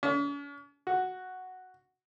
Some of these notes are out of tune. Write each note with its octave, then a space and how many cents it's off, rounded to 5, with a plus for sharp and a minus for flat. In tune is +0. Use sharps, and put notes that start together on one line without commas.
C#4 +45
F#4 +0